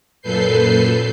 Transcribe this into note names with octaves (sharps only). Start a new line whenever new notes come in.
F#2 A#2 A4 B4 G6 C7